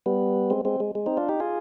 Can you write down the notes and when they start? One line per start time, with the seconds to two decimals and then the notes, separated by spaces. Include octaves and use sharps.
0.06 G3 B3
0.50 G#3 C4
0.65 G#3 C4
0.80 G#3
0.95 G#3
1.06 C4 D#4
1.17 D4 F4
1.29 D#4 G4
1.40 F4 G#4